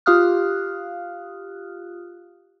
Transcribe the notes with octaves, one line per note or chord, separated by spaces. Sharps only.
F4 G4 F5 D#6 F6 F#6